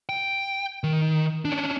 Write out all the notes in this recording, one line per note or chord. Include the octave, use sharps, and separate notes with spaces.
G5
D#3
C#4 D4